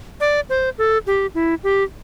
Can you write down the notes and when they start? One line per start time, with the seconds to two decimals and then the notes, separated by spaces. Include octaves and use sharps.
0.20 D5
0.50 C5
0.78 A4
1.07 G4
1.35 E4
1.64 G4